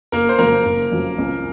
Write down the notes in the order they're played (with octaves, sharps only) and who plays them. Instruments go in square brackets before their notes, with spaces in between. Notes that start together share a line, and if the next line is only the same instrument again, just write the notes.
[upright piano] F#1 [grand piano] A#3 A#4
[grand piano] C5
[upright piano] F2 C#3 F#3 [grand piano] A#3 A#4
[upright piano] F#1
F2 C#3 F#3
C#2